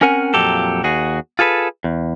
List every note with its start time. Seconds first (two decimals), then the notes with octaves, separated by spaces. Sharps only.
0.01 C4 C#4 A#4 F#5 G#5
0.34 F2 A#2 F#3 G4 A4
0.84 D#2 F#4 G#4
1.39 F4 G#4 A4 B4
1.84 E2